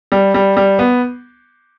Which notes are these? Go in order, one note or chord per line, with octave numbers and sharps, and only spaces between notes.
G3
G3
G3
B3